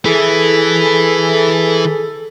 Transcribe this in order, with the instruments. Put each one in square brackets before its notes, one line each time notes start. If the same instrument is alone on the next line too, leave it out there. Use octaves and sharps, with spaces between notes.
[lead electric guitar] E3 E4 [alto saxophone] G#4 [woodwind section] A4